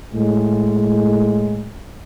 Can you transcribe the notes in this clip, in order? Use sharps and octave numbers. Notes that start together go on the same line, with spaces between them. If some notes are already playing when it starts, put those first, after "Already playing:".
A2 G#3